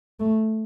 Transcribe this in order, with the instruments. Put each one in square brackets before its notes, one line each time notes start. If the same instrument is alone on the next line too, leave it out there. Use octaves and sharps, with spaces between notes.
[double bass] A3